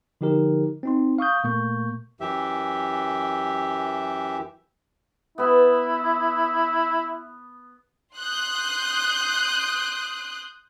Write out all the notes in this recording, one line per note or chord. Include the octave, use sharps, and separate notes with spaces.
D3 F3 D#4 G4 A#4
C4 D#4 C6
F5 C#6 D#6 G6
A#2 A3 A#3 C#6 G6
F#2 E3 G4 E5
B3 E4 B4
C6 D#6 F#6 G6